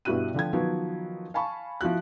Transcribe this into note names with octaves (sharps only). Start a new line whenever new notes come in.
G2 B2 E4 F#4 F#6 D#7
D3 F3 G5 G#6
D#3 F3 F#3 B3
F5 G#5 A5 B5 C#6
F3 E4 F#4 F#6